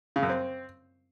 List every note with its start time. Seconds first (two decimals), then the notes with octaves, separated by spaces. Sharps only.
0.16 C#3
0.23 F#2
0.29 C4